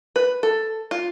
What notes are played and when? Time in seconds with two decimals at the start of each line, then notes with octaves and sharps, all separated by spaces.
0.16 B4
0.43 A4
0.91 F4